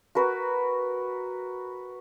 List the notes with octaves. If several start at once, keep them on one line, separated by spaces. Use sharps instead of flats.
F#4 A#4 B4